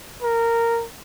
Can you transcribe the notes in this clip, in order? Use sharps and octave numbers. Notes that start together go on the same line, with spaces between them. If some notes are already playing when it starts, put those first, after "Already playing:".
A#4